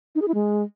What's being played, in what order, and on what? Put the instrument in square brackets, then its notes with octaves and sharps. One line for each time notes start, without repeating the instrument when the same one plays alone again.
[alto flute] D#4
G#4
E4
G#3